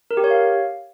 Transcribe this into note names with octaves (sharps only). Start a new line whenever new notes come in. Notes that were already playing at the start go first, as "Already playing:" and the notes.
A#4
G4
C#5
F5